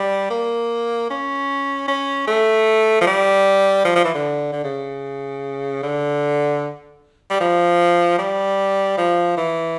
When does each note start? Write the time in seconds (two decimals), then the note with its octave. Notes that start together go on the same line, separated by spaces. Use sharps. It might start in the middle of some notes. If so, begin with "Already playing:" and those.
Already playing: G3
0.30 A#3
1.10 C#4
1.88 C#4
2.27 A3
3.01 F3
3.07 G3
3.85 F3
3.96 F3
4.04 E3
4.15 D3
4.52 D3
4.64 C#3
5.83 D3
7.30 G3
7.40 F3
8.18 G3
8.98 F3
9.37 E3